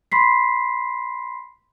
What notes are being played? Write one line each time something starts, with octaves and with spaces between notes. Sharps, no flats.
B5 C6 B6 C7